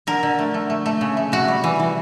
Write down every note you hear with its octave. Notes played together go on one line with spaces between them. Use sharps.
D3 A#4
D3
A3
A3
A3
A3
C#3
A3
C3 F#4
G3
E3
E3